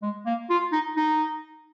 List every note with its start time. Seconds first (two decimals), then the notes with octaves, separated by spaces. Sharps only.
0.02 G#3
0.26 A#3
0.50 F4
0.72 D#4
0.97 D#4